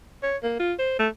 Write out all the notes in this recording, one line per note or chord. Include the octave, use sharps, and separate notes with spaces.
C#5
A#3
F4
C5
A3